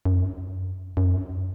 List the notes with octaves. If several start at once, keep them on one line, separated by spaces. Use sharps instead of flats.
F#2
F#2